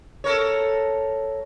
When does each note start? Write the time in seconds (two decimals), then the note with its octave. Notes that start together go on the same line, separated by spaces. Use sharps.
0.24 A4 A#4 C#5